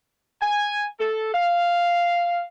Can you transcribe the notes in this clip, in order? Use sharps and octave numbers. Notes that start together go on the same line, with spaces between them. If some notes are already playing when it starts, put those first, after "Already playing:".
G#5
A4
F5